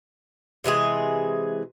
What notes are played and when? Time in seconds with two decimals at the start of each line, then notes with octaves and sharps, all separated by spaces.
0.64 C3 E3 G#3 G#4